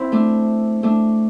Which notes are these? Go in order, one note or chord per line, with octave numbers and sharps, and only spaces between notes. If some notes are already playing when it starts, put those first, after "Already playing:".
Already playing: C4 E4
A3 D4
A3 D4